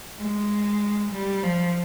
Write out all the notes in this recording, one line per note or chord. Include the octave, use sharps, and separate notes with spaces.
G#3
G3
F3